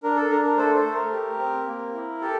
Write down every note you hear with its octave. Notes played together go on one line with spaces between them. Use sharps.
D4 A#4
A4
D4 A#4
A#4
A3 A4 C5
A4 C5
A3
A#4
G4
C4
A#3
E4
G4 A4